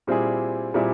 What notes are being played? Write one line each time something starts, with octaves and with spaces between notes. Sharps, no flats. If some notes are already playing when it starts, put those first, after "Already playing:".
A#2 G3 C4 E4 G#4
A#2 G3 C4 E4 G#4